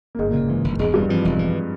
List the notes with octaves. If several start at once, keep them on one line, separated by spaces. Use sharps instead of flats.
A#3
G1 G#2 G#3
A#2 A#3
C#3
G#2 E3 G#3
G1
E1 G#2 G#3
G2 E3 G3
F2 E3 F3
E1 G#2 G#3
E3